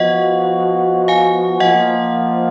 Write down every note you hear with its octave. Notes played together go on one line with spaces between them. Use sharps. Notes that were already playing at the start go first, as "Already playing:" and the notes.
Already playing: F3 B3 F#4 D#5 F#5
F5 G#5
F3 A#3 F4 D#5 F#5